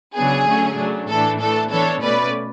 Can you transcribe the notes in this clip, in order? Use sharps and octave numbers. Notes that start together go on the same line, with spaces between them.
C#3 F#3 B3 D4 G#4
D3 F#3 A3 C#4
C#3 F#3 A3 D4
A2 E3 A3 D4 A4
E3 A3 D4 A4
E3 B3 D4 A4 C#5
B2 A3 C#4 B4 D5